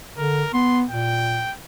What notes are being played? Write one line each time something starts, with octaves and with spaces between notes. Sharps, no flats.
D3 A#4
B3 C6
A#2 G5